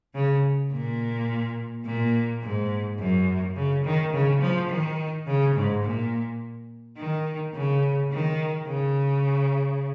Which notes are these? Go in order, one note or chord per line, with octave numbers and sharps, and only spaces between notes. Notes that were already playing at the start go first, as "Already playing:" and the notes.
C#3
A#2
A#2
G#2
F#2
C#3
D#3
C#3
F3
D#3
C#3
G#2
A#2
D#3
C#3
D#3
C#3